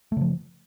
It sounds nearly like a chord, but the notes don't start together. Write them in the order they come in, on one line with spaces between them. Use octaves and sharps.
A3 C#3 F3